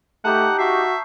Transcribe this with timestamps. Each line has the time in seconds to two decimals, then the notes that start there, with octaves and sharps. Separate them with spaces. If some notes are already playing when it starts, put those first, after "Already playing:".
0.25 A3 D#4 G4 F#5 A5 A#5 G6
0.59 F#4 E5 C#6 D#6 C7